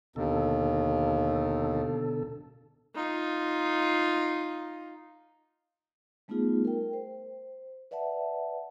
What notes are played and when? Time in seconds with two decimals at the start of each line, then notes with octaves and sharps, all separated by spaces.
0.16 D#2 B2 D3 A4
2.95 D#4 F4
6.28 G3 A3 B3 D#4 F4 G#4
6.65 A#4 G5
6.93 C5
7.91 B4 D5 E5 F#5 A5